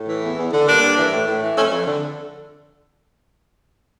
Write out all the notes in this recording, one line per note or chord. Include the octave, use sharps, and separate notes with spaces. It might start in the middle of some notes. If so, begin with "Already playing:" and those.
Already playing: A2
E3
E2
E2
D3
G2 A#3 D4
G2
E3
A2
A2
E3
F2 A3 C#4
F2
D3